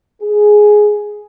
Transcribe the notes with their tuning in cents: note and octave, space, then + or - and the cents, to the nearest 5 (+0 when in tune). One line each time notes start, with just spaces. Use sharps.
G#4 +10